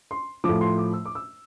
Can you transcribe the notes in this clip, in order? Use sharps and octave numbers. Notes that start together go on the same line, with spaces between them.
C6
F3 D6
A2
C6
D6
E6
D6
E6